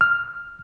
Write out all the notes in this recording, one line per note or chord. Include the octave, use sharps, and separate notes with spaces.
F6